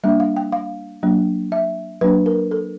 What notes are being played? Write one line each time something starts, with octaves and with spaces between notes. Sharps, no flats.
G3 A#3 D4 E5
F5
G5
F5
F#3 A#3 D4
E5
F#3 A#3 D4 B4
A#4
A4